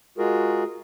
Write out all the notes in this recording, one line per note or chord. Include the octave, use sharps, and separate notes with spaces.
G#3 F4 F#4 G#4 A#4